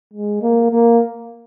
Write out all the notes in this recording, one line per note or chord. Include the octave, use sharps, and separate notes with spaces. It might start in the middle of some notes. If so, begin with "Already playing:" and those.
G#3
A#3
A#3